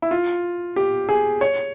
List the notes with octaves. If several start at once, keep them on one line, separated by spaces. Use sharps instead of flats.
E4
F4
G4
G#4
C#5